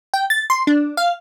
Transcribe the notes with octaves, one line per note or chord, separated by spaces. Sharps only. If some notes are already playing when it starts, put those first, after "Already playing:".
G5
A6
C6
D4
F5